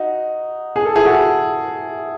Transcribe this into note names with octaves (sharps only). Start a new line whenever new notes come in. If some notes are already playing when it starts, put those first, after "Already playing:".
Already playing: D#4 F#4
G#4
A4
E4 G#4
F#4 A4